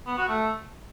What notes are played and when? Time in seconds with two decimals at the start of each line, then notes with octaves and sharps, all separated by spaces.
0.07 B3
0.18 F#4
0.29 A3